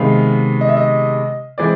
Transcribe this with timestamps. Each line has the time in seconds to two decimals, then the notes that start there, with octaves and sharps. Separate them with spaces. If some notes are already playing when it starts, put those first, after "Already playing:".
Already playing: C3 D#3 G#3 B3 F5
0.61 D#5
0.69 E5
0.77 D#5
1.58 E3 G#3 C4 D5